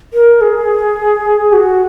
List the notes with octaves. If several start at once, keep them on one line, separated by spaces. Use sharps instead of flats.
A#4
G#4
F#4